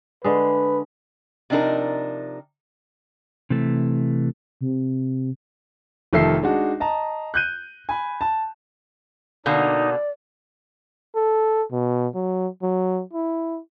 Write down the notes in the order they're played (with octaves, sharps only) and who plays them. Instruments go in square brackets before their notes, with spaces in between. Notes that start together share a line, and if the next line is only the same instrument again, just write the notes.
[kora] D3 G#3 [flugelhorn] B4
[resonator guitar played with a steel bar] C3 F3 D4 D#4 A#4
[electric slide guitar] C3 E3 A3
[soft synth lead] C3
[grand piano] F1 D#3 F3 A4 E5 C7
G#3 D4 D#4 F#4
D#5 A5 A#5
F#6 G6 D#7
G#5 B5
A5
[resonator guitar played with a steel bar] B2 D3 A#3 [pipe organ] D#4 [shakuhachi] D5
[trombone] A4
B2
F#3
F#3
E4